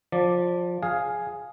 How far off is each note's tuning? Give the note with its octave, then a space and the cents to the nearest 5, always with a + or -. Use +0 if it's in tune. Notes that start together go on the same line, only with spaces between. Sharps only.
F3 +20 D5 +0
G#4 +0 F5 +5